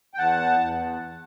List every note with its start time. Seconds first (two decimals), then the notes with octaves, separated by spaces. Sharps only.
0.14 G5
0.18 E2 F#5 A5
0.60 E2